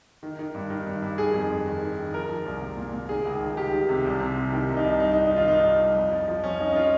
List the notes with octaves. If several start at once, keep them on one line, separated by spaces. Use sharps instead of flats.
D#3
D#3
G2
D#3
G2
G2
D#3 G#4
F2
F2
D#3
D#3
D#3
F3 A#4
F3
C2
C2
A#2
A#2
D#3 G#4
C#2
D#3
C#2 G4
D#3
C3
C2
C3
C2
D#3
C2
D#4
C2
G2 D#4
D#4
D#3
D#4
D#3 F4
G2 D#4
D#3
G2
F2
F3
F3
F2 C#4
F3 D#4
D#4
F3 F4